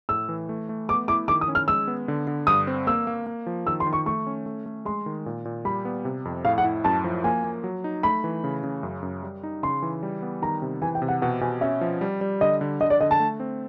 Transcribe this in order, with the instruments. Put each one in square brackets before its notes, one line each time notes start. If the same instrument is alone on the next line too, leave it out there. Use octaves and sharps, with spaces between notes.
[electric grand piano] A2 [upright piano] E6
[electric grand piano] E3
A3
A3
[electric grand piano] B3 [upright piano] D6
[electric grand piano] E4 [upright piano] D6
[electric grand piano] D#3 [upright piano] D6
[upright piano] D#6
[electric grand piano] C#4
[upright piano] F6
[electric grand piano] G#3 [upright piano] E6
[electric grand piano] B3
D3
D3
[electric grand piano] G2 [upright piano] D#6
[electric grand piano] C4
[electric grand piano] A#3 [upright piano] E6
[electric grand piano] A#3
A#3
F3
[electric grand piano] D#3 [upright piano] E6
[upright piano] C6
[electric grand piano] D#3
[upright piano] C#6
[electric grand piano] A3 [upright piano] C#6
[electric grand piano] C#4
A3
A3
[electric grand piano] G#3 [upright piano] C6
[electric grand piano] D#3
A#2
A#2
[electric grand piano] G3 [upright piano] B5
[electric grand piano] B3
C3
F2
[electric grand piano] A2 [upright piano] F5
[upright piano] F#5
[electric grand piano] E4
[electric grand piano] F#2 [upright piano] A5
[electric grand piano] F3
[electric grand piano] A#3 [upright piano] G#5
[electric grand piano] A#3
F#3
D#4
[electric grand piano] A3 [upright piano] B5
[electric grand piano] E3
C#3
C#3
F#2
F#2
G3
D#4
[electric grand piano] C#3 [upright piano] C6
[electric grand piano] E3
G3
B3
[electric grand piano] D#3 [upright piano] A#5
[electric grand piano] C3
[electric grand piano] E3 [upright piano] G#5
[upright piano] G5
[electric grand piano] C3
[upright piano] F#5
[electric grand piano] B2 [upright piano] F#5
[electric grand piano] B2 [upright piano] G#5
[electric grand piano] C#4 [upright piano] E5
[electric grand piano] F3
G3
G3
[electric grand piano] D3 [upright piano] D#5
[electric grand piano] D3
[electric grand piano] D3 [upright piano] D#5
[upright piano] D5
[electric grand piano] D3 [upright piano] D#5
[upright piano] A5
[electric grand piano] A3
C4